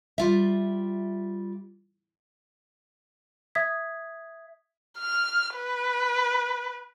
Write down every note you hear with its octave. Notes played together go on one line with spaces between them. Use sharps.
G3 F4 E5
E5 D#6 G#6 B6
F6
B4